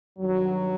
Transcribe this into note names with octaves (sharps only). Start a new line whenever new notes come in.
G2 D#3 F#3